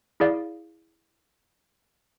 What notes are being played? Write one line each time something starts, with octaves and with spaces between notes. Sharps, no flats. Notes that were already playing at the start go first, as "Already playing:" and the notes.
E4 G#4 D5 F5